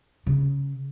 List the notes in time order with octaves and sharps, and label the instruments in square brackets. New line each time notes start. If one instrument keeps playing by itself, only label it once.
[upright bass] C#3